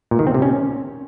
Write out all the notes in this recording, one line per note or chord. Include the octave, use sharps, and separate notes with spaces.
A#2
D#3
C4
C3
C#4